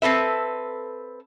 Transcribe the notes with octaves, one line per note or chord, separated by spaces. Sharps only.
C4 A4 B4 E5